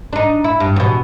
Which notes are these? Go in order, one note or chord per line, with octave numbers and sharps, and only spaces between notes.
D4 D#4
E4
G2
E2 B2